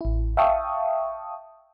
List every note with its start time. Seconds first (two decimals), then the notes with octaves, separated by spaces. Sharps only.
0.01 A1 E4
0.37 E5 F5 G5 A5 C#6 D#6